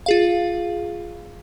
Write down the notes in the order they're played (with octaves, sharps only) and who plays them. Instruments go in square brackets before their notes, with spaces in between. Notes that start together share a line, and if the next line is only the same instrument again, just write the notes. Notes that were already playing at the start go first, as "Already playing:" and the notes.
[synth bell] F4 G#4 F5